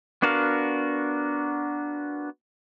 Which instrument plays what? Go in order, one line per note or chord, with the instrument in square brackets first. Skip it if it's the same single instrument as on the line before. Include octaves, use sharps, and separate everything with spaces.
[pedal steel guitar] B3 D4 F#4 A#4 F5